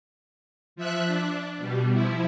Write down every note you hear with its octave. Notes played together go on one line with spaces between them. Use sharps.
F3 E5 F#6
D4
B2 G3
F3 E4